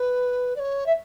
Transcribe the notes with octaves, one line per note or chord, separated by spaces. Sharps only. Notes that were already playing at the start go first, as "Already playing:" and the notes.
Already playing: B4
D5
C#5
E5